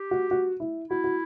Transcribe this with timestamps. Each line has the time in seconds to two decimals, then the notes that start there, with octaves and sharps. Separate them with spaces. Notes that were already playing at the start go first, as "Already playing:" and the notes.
Already playing: G4
0.11 F#4
0.31 F#4
0.60 E4
0.89 E4 F#4
1.04 F#4